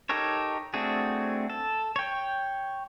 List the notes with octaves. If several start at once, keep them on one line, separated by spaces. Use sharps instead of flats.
D#4 G4 A4 A#4 C#5
A3 C4 D4 F#4 G#4
A4
C#5 G5